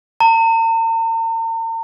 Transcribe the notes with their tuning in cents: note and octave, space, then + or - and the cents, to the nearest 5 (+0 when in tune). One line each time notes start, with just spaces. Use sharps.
A#5 -45